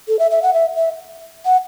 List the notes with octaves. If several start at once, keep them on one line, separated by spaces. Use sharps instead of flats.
A4
E5
E5
F#5
E5
E5
F#5